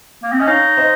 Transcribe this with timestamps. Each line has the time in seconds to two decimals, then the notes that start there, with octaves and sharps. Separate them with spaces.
0.23 A#3
0.32 C4
0.40 C#4 D#5
0.47 D#4 C#5 F5
0.77 C5 D#5